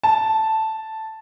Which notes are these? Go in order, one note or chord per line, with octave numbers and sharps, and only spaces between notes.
A5